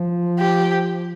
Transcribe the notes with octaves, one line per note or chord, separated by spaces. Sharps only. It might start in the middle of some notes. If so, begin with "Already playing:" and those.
Already playing: F3
G4